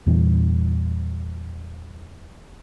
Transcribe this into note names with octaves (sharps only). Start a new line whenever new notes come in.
E2 A#2 E3 G3